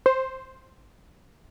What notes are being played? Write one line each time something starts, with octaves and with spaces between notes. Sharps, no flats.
C5